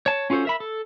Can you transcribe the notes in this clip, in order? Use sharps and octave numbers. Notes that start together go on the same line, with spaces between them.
C#5 A5
C#4 F4 F#4 A4 C5
A#4 E5 B5
A4